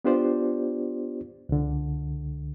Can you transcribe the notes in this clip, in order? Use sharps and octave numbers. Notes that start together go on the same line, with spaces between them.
B3 D4 F4 G4 C5 D5
C#2 D3